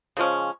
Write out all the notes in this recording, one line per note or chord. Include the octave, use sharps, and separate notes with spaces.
C#3 F3 G#3 C#4